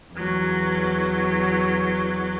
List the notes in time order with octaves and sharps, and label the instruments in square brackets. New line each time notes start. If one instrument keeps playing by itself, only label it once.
[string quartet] E2 F#3